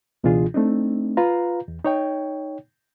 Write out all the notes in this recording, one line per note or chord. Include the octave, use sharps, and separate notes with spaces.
C#2 B2 E3 D4 F4 G#4
A3 C4 D4 D#4
F4 B4 F5 A#5
E2
D#4 C#5 G5